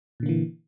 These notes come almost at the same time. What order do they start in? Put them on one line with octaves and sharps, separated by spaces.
A#2 D3 A#3 E3